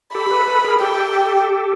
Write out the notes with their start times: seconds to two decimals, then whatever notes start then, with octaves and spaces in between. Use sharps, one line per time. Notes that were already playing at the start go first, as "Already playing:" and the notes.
0.15 G4 A4 B5
0.31 A4 B4
0.47 A4 B4
0.64 G#4 A#4
0.80 G4 A4 G5